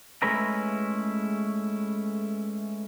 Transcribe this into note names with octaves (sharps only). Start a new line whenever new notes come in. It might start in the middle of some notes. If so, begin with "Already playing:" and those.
G#3 A3 C#4 E4 B4 A#5